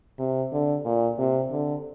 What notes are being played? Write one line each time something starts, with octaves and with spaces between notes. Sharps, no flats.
C3
D3
A#2
C3
D3